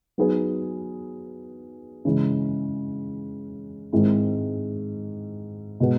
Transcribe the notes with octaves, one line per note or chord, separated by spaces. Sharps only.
F#3 B3 D#4 G#4 B4
C#3 E3 G#3
G#2 D#3 G#3 C4 E4
B2 G#3 B3